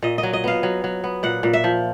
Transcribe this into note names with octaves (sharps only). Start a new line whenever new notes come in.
A#2 D#5
D#5
F#3
D#5
B3 F5
F#3
F#3
B3
A#2 F#5
A#2
E5
F3